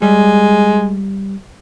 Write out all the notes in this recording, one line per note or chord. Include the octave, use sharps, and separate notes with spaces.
G3 G#3